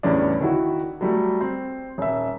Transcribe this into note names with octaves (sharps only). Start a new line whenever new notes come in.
E2 A2 C#3 G3 C#4 D4
D#3 E4 F#4
F#3 G3 A3
C4
D#1 E5